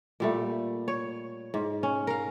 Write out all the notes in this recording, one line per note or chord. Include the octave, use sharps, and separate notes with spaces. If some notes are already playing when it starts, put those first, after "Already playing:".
A#2 G3 A3
C#5
G#2
C#4
A#4 F5